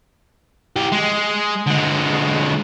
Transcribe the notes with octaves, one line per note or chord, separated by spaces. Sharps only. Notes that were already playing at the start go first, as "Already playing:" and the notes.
E3 G4
G#3
D3 G#3